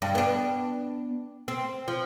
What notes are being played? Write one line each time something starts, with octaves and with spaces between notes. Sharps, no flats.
G2
B3 D4
C4
F3